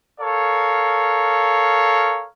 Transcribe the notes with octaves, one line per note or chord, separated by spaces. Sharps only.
A4 A#4 C#5 F5